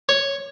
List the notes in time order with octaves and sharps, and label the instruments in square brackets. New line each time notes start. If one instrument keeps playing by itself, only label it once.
[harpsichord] C#5